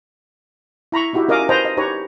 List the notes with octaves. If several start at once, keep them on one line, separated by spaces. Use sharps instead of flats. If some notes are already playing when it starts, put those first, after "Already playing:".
E4 A#5 B5 C#6
D#4 E4 F#4 G4 E5
C#4 A#4 D#5 F5 D6
B4 C5 D#5 G5 A5 A#5
D#5
D#4 G4 B4 C#5 A#5